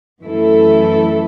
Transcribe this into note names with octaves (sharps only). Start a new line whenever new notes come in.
F#2 E3 A3 E4 A4